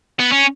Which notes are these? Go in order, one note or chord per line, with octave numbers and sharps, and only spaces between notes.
B3
C#4